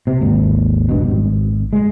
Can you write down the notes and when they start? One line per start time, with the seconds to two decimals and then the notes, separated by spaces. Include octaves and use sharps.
0.07 C3
0.21 G#1 D#2
0.89 F1 G2 B2
1.04 G#1
1.73 G#3